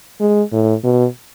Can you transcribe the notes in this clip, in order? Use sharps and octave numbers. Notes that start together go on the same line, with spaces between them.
G#3
A2
B2